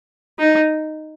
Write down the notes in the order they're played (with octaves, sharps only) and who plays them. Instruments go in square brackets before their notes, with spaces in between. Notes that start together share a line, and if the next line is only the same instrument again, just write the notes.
[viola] D#4